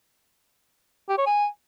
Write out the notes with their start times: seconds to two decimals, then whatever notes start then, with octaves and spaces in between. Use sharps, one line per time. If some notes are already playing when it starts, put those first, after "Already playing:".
1.09 G4
1.18 C#5
1.26 G#5